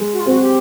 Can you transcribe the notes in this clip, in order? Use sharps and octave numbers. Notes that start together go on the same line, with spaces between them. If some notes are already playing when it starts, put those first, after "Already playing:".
Already playing: G#3
F#4
F4
C4 F#4
G4